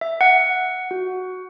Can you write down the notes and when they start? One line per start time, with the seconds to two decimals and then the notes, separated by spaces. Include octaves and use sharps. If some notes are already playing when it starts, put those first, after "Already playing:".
0.01 E5
0.21 F#5
0.91 F#4